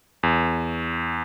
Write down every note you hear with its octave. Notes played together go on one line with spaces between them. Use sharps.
E2